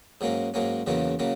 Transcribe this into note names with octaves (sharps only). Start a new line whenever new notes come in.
G#2 F#3 A#3 C#4
G#2 F#3 A#3 C#4
E2 C#3 F#3 A#3 C#4
C#3 F#3 A#3 C#4